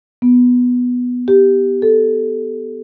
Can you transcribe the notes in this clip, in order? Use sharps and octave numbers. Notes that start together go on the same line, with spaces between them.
B3
G4
A4